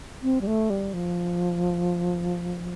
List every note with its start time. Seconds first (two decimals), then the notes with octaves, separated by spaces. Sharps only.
0.23 C4
0.41 G3
0.47 A3
0.70 G3
0.94 F3